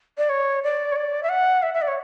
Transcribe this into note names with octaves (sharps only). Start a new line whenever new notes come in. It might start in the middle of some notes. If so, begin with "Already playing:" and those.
D5
C#5
D5
C#5
D5
E5
F#5
E5
E5
D5
C#5